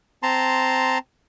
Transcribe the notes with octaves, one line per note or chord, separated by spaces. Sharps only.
C4 A5 A#5 C6